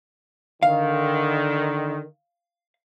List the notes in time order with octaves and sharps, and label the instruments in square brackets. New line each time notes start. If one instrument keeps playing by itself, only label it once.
[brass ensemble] D3 D#3 [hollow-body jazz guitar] F5